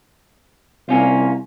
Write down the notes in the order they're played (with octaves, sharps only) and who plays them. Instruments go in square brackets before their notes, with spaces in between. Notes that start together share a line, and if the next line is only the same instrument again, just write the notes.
[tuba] C2 [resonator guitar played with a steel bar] A#3 C#4 F4